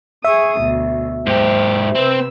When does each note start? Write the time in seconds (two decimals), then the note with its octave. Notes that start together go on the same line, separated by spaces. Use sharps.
0.25 G#4 E5 C#6 D#6
0.60 D2 B2
1.27 G#2 G4 C5
1.95 C3 C4 B4 E6